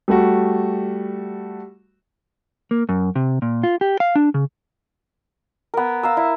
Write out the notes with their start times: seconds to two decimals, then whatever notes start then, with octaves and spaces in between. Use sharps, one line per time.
0.08 G3 A3 F#4
2.71 A#3
2.89 F#2
3.16 C3
3.42 A#2
3.63 F4
3.81 G4
4.00 F5
4.15 D4
4.34 C#3
5.74 B3 A#4
6.03 F5 A#5 E6
6.17 E4